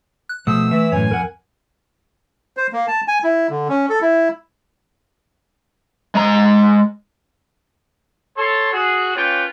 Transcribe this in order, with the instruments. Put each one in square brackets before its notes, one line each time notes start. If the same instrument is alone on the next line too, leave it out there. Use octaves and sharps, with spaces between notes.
[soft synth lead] F#6
[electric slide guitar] B2 A3 [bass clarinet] F3 [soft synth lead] D#6 [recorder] E6
[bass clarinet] E3 [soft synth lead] A3 [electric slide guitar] E5
[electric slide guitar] F#2 A2 [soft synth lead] C#5 [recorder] G#5
[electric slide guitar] F2 F#5 [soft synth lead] A#4
[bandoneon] C5
A#3
A5
G#5
E4
D3
C#4
A4
E4
[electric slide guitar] G#3 A#5
[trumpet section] A4 C#5 C6
F#4 G#4
A#3 C#4 F4 B4 C#5 G5